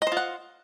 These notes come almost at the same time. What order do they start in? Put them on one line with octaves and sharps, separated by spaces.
D#5 C5 F4 F#5